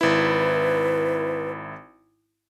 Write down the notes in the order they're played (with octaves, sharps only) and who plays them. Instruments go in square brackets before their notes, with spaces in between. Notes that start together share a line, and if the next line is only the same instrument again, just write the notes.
[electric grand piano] G#1 E4 [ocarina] B4